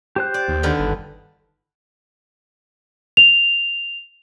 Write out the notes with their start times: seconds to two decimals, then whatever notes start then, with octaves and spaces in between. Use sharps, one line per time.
0.16 G4 C5 F#6
0.34 D5
0.48 D#2
0.63 D3 D#3 B4
0.79 G1
3.17 F7